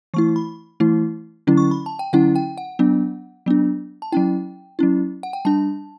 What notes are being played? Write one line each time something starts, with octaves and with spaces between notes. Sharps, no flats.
E3 A3 E4 C#6
B5
E3 A3 E4
D3 F#3 C#4 E4
C#6
B5
A5
G5
D3 F#3 C#4 E4 F#5
G5
F#5
F#3 B3 D4
F#3 B3 D4
A5
F#3 C#4 E4 G5
F#3 C#4 E4
F#5
G5
G3 D4 A5